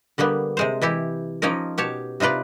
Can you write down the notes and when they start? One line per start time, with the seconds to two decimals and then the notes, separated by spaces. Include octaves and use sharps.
0.18 D3 G3 A#3 B3
0.57 C3 G#3 C5
0.82 E3 E4 G4
1.42 F3 A#3 C#4 D#4 A#4
1.78 B2 G4 C#5 A5
2.20 C3 D#4 F4 B4 D5